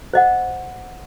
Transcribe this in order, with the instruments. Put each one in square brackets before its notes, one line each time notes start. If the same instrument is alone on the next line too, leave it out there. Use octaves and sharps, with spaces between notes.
[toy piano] C5 D#5 F#5